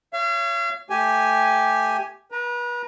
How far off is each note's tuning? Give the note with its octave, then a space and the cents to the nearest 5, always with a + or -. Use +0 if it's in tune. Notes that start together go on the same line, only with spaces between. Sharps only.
C#5 +5 F5 -40
A3 +0 G4 +0 G#5 +0
B4 -35 A#5 +0